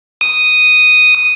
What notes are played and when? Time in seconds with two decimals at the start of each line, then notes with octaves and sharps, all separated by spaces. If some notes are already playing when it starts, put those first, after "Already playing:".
0.21 D#6